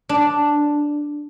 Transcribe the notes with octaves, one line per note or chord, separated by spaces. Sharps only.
D4